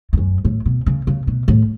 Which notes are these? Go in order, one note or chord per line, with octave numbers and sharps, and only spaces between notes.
E2
F#2
A2
B2
C#3
C#3
B2
A2